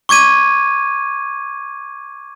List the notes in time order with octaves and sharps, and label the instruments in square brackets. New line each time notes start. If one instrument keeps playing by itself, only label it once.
[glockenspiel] C#6 D6 G#6 D#7